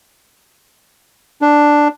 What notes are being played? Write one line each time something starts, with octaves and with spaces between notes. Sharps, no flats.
D4